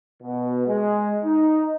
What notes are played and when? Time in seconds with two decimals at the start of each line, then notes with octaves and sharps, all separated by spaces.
0.22 B2
0.67 G#3
1.25 D#4